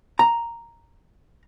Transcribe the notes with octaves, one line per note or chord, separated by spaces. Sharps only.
A#5